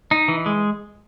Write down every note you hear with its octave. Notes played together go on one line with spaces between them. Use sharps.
D#4
E3
G#3